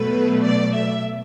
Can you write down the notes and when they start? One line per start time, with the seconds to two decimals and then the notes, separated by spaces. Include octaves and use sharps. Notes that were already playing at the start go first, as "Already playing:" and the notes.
Already playing: B2 F#3 A3 B4
0.44 D5
0.74 E5